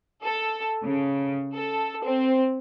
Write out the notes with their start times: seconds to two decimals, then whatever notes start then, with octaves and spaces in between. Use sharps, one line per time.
0.24 A4
0.84 C#3
1.54 A4
2.04 C4